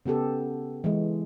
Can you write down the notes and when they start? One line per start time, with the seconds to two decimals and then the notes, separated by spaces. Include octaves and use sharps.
0.06 C#3 B3 G4 A4
0.84 E3 G#3